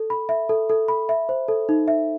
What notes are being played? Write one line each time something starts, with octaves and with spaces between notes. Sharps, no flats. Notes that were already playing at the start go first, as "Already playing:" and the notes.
Already playing: A4
B5
E5
A4
A4
B5
E5
C5
A4
D#4
E5